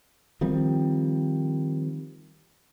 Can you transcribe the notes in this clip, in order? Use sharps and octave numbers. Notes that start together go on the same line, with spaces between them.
D#3 F3 G3 C4